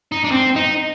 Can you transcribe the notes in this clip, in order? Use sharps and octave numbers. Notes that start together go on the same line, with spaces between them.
D#4
D4
C4
D#4